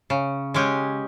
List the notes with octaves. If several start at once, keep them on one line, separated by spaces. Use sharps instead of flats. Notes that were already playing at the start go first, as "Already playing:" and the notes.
C#3
G#3 C#4 G4